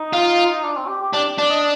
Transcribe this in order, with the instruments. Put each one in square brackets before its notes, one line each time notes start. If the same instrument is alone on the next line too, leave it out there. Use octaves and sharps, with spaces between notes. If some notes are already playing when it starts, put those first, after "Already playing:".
Already playing: [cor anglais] D#4
[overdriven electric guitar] F4
[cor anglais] D4
C4
G4
G4
[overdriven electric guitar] D4 [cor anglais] G4
[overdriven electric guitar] D4 [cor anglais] D5
[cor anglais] D#5